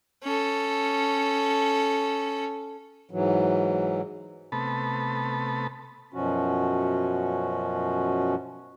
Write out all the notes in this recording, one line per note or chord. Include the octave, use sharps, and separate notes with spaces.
C#4 A4
G#2 E3 F#3
C3 A3 B3 A5 B5
F#2 B2 F3 C#4 F#4